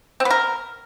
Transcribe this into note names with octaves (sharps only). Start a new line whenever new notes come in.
C4
B3
A#4